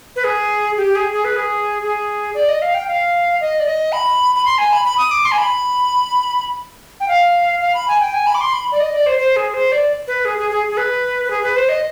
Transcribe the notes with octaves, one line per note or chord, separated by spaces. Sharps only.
B4
G#4
G4
G#4
G#4
B4
G#4
G#4
D5
D#5
F5
G5
F5
D#5
D5
D#5
B5
B5
C6
G#5
B5
B5
D#6
D6
C6
G#5
B5
G5
F5
F5
B5
G#5
G5
G#5
B5
D6
C6
B5
D5
D#5
D5
C5
C5
G#4
C5
D5
B4
G#4
G#4
G#4
G#4
B4
B4
G#4
B4
C5
D#5